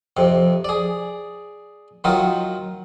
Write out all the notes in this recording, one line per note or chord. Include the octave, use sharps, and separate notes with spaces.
F2 C3
G#4 D5
D#3 F#3 D#4 F4